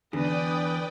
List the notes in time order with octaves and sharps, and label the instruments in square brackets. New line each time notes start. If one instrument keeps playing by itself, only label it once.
[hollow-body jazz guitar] E2 [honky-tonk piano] D3 [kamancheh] B4 D#6 [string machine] D5 G5